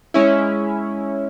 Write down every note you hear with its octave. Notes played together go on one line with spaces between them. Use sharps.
G#3 C#4 E4